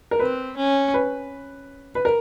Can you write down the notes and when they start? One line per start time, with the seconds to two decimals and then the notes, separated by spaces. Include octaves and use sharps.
0.11 A#4
0.19 C4 B4
0.57 C#4
0.94 B4
1.95 B4
2.05 A#4